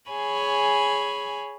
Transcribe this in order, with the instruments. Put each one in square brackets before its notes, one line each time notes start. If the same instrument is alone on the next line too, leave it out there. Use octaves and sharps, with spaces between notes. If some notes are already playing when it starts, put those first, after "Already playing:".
[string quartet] G#4 C#5 G#5 B5